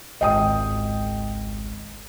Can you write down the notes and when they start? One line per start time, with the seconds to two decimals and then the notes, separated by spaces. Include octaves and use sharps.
0.21 G#1 C#2 D#5 G5 D#6